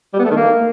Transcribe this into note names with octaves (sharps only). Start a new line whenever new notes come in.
G3
B3
A3
D#3
A#3